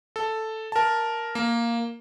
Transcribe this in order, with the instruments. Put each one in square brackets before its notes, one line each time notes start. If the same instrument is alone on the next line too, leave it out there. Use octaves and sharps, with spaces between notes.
[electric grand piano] A4
A#4 A5
A#3